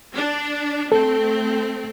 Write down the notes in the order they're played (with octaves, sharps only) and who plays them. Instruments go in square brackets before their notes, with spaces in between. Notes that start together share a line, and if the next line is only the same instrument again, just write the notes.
[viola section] D4
[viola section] A3 C4 [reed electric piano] A4